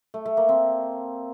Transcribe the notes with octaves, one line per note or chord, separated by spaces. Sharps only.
A3
A3
A#3
C4